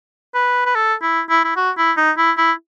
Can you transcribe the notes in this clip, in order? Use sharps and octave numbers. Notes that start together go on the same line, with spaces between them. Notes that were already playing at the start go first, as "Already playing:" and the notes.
B4
B4
A4
E4
E4
E4
F#4
E4
D#4
E4
E4